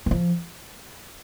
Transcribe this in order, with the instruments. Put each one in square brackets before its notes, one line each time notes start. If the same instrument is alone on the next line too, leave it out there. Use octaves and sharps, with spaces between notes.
[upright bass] E3
F3